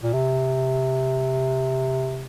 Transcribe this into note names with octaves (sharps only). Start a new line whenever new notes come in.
A#2
C3